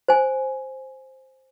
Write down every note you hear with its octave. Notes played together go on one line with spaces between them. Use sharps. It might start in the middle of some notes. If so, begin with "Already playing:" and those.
C5 G#5